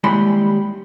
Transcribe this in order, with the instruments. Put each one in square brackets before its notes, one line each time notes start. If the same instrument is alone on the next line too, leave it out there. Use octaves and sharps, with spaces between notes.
[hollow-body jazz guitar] D#2 G3 G#3 E4 B5 C6